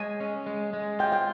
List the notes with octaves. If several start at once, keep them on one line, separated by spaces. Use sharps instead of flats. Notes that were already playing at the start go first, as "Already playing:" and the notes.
Already playing: G#3 G#5
C#4
G#3
G#3
F4 G5
G5